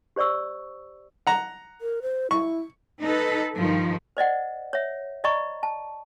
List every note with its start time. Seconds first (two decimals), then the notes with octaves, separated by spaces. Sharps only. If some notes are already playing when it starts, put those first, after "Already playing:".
0.16 G4 C5 D5 C#6 E6
1.27 F#5 A#5
1.81 A#4
2.02 C5
2.31 E4 C#6
3.02 D#4 A4 B4
3.58 G2 D#3 F3
4.17 C5 D5 D#5 F#5
4.73 C#5 E5
5.24 D5 D#5 A#5 B5 C#6
5.63 A5